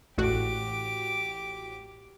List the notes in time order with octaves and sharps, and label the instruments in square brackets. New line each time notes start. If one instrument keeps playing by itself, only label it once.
[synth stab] A1 A2 F#4 [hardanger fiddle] G4 D6